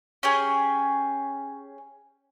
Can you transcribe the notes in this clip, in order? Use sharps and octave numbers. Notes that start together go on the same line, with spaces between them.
C#4 G4 G#4